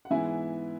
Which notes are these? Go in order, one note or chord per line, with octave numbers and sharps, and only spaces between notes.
F#5
G#2 E3 B3 E4 E5 G#5